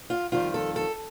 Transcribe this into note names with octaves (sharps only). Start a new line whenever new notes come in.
F4
F2 D#3 G3 F4
A4
A4